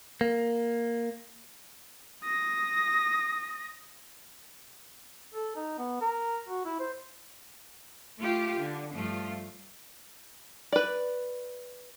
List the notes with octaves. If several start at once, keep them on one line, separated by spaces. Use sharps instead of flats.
A#3
D#6 A#6
A4
D#4
B3
A#4
F#4
E4
C5
A3 F4 G4
D3
G2 F3 A3 F4
B4 D5